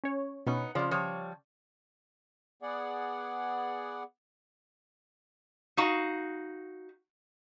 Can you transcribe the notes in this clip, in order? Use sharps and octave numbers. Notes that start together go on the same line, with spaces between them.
C#4 C#5
B2 B3 C#4 D#4
F2 C#3 F3 D5
F3 G3 C#5
B3 G#4 D5 F#5
D#4 F#4 F5